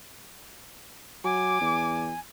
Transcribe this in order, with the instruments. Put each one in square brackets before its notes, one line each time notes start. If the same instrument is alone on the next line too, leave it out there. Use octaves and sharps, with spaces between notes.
[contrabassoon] F#3 [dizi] G#5 [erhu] D6
[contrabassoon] E2